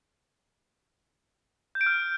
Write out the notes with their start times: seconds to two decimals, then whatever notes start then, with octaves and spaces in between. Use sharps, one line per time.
1.75 G6
1.81 D7
1.86 F6